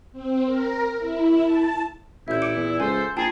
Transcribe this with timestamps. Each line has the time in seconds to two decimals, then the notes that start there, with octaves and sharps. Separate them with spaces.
0.12 C4
0.45 A#4
0.98 E4
1.42 A5
2.28 A1 A#2 E4 E5 G6
2.42 D6 C#7 D7
2.57 E2
2.80 C#2 A4 C5 G#5
3.17 A#1 D#4 F4 G#4 G5 A5 C7